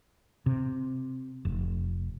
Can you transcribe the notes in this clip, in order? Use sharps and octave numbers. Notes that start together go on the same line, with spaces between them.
C3
F1